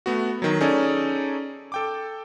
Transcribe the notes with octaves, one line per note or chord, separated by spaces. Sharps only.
A3 B3 F#4
D#3 F#3
C#4 D#4 G#4 A4 D5
A4 G5 D6